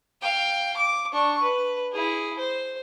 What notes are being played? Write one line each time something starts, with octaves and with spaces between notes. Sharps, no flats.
F5 G5
D6
D4 C#6
B4
E4 G#4
C5